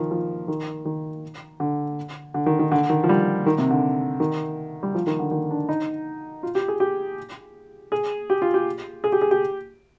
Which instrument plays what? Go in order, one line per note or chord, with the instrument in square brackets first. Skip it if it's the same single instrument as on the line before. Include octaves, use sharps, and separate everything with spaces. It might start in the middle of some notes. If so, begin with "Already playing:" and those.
Already playing: [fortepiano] D#3 F3
F3
D#3
D#3
D3
D3
D#3
D#3
D3
D#3
F3
G3
D#3
C3
D3
D#3
G3
F3
D#3
D3
D#3
D4
D#4
F4
G4
G#4
G4
G#4
G4
F4
G4
G#4
G4
G#4
G4